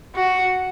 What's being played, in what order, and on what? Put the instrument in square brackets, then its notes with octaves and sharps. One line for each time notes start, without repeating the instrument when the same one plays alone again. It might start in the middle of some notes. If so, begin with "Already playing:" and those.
[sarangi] F#4